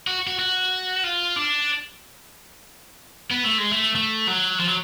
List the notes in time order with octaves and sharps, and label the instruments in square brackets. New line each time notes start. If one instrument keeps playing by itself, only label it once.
[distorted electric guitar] F#4
F#4
F#4
F4
D4
B3
A3
G#3
A3
A3
F#3
F3
F#3